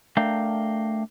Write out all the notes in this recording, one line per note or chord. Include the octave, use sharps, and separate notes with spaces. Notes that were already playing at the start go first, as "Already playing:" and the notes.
A3 D4 A#4 F5 G5